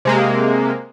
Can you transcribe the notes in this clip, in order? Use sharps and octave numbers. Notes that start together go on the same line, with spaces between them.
C3 G#3 A#3